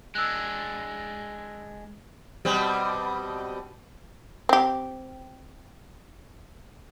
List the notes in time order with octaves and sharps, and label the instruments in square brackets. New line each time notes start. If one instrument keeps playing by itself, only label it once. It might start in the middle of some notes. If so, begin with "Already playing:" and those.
[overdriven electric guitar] G#3 D4 [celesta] E6 F#6
[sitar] B2 G3 C4
[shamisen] C4 G4